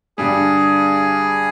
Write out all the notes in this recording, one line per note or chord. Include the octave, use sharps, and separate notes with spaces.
G2 D3 G3 G#4